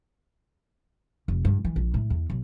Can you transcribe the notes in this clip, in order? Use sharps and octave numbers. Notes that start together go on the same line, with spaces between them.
F1
G2
E3
A#1
A2
E2
B1